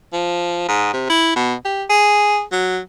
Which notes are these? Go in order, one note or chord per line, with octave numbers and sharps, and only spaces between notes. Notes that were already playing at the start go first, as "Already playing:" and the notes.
F3
G#2
C3
E4
B2
G4
G#4
F#3